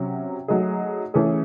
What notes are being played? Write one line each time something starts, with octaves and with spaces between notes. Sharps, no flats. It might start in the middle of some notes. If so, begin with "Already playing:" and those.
Already playing: C3 F#3 C#4
F#3 A3 D#4 G#4
E3 A3 C#4 G#4